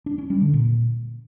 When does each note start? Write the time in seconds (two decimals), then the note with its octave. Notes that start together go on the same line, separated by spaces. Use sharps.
0.06 D4
0.18 C#4
0.30 G3
0.42 D3
0.54 A#2